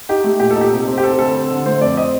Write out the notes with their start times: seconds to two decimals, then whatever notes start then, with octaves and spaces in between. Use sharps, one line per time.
0.09 D#4 G4
0.24 A3
0.40 A#2 G4
0.51 A4
0.56 D#4
0.61 G4
0.72 C3
0.87 C4
0.98 G4
1.03 C4 A4
1.19 D2 A4
1.35 C4
1.51 D3
1.66 A3 C5
1.81 F2 D5
1.97 C4 D#5